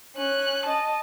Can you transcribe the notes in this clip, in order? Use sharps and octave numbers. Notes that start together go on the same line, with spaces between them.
C#4 F#6
D#5 A5